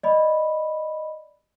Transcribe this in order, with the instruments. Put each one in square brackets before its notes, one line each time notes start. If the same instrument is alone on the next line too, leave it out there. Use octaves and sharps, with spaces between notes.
[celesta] D5 D#5 B5